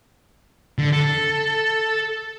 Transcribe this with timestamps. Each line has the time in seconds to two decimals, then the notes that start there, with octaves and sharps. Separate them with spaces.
0.79 D3
0.93 A4